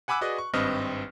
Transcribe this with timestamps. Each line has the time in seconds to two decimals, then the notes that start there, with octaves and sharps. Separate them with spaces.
0.08 F#5 G#5 B5 D6 E6 F#6
0.21 F#4 G#4 B4 D5 D#5
0.38 C#6
0.53 G#1 G2 C4 B4 D#5 F6